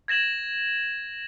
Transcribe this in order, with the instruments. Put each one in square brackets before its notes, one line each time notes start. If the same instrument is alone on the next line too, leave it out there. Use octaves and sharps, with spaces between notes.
[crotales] G#6 A#6 E7 F#7